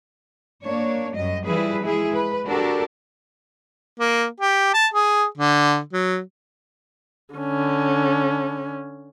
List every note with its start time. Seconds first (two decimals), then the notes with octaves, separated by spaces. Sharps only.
0.64 A#3 D4 C#5
1.15 F#2 G3 D#5
1.46 E3 F3 G3 E4 G#4 B4
1.83 G#3 E4 G#4
2.13 B4
2.45 D4 F#4 G4 A4 A#4
4.00 A#3
4.41 G4
4.74 A5
4.94 G#4
5.38 D3
5.93 F#3
7.35 D3 C#4